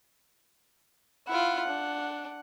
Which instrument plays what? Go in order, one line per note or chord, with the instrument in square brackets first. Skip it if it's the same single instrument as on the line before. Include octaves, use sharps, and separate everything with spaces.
[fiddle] E4 F4 [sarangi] F#5
[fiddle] D4